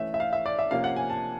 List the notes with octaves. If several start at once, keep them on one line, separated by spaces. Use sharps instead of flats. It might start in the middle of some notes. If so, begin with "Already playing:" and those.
Already playing: E3 A3 C#4 E5
E5
F5
E5
D5
E5
C3 F3 A#3 C#4 F5
F#5
G#5
A5